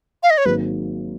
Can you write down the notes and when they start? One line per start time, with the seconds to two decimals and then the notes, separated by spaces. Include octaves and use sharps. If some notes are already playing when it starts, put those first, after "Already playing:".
0.23 F5
0.30 D#5
0.38 C#5
0.45 G#1 G#2 F#3 A#3 B4